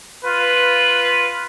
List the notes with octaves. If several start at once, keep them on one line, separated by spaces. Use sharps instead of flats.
F4 B4